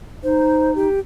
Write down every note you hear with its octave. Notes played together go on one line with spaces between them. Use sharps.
D#4 C5
G4